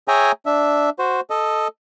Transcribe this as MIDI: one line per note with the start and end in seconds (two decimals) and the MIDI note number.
0.08 0.32 68
0.08 0.32 73
0.08 0.32 76
0.08 0.32 79
0.08 0.32 80
0.08 0.32 82
0.46 0.90 62
0.46 0.90 76
0.99 1.20 66
0.99 1.20 72
1.30 1.68 69
1.30 1.68 75